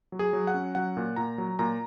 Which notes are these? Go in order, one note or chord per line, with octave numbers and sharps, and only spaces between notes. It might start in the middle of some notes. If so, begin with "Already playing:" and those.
F#3
G#4
F#3
F#5
C#4
F#3 F#5
A#2
A#2 A#5
F#3
A#2 A#5